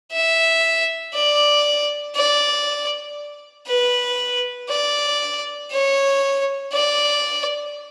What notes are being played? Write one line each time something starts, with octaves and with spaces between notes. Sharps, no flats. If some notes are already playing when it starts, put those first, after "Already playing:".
E5
D5
D5
B4
D5
C#5
D5